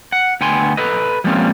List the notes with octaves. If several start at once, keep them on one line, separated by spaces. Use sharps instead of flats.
F#5
D2 B3 G5 G#5 C6
A4 B4 D#5
F3 G3 G#3 A#3 C4 C#4